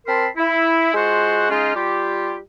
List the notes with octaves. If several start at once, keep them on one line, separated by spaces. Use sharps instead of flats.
C4 A#4 A5 B5 C6
E4
G#3 F4 F#4 C5 F#5
G#3 C#4 D#4 F4
G3 F4 G4